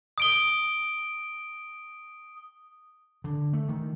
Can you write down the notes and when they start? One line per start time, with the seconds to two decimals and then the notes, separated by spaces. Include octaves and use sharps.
0.18 D#6 D7 G7
3.24 D3
3.53 A3
3.69 D#3